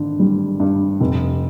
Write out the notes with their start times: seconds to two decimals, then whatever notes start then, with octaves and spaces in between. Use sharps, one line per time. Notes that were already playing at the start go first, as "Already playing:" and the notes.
Already playing: G#1 D3
0.20 G3
0.60 G2
1.01 F1